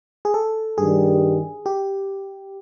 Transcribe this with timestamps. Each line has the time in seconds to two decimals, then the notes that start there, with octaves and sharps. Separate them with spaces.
0.25 G#4
0.34 A4
0.78 G2 D#3 G3 G#4
1.66 G4